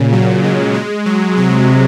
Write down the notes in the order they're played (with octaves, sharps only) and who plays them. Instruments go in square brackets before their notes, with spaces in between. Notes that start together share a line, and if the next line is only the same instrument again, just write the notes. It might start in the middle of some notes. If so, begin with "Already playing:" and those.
Already playing: [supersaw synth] A#2 C#3
F#3
G#3
G#3
F#3
[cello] C3 [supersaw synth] F#3